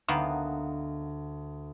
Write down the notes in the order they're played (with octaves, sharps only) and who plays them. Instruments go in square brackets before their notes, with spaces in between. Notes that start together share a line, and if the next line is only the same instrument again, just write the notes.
[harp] D2 [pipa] D#3 A#3 B3